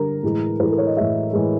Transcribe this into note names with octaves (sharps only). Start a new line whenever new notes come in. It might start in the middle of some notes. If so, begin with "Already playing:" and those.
Already playing: D3 G3 A#4
A2 E3 G#3
A2 E3 G#3 A4 B4
A#4
C#5
D#5
A2 E3 G#3 E5
A2 E3 G#3